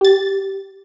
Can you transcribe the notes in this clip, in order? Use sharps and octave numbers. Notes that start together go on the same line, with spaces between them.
G4 A6